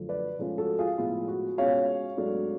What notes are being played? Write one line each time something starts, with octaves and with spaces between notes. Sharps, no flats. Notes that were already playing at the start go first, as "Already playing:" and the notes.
Already playing: F#2 D3 F3 A3
B4 D5
G#2 F3 A3 C#4 F4
F#4 A4
F4 G#4
A2 F3 G#3 B3 F4
F#4
B2 G#3 C#4 F4 C#5 F5
G#2 F#3 A3 D4